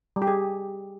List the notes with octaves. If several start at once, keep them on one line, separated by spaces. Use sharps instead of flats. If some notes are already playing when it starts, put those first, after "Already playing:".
G3
G4
G#4